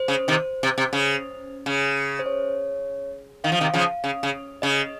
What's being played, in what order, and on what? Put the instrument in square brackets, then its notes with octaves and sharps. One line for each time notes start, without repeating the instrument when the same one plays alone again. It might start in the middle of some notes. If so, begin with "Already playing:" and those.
Already playing: [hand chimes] C5
[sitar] C#3
C3 D#3
C3
C3
C#3
C#3
[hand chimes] C5
C#5
[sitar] D#3 [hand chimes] F5
[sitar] F3
C3 D#3
C#3 F3
C#3
C#3
[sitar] C#3 [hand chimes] D#5